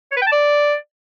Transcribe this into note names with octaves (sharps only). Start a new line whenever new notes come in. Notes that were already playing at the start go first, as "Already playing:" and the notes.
C#5
B4
G5
A5
D5